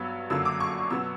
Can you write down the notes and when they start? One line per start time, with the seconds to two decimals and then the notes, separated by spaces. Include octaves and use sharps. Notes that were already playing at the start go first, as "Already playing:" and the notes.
Already playing: G2 F#3 B3 E6
0.30 F#2 D3 F#3 A#3 E6
0.45 D6
0.60 C#6
0.90 B2 F#3 B3 E6